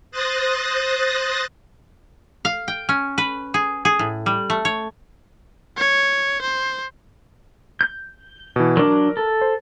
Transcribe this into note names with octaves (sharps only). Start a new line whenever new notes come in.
C5 D#6 F#6 A6 A#6
F5
G5
C#4
B4
G#4
G#4
A2
G3
A3
C#5
C#5
C5
G6
B2 E3
F#3 D4 A#4
A4
C5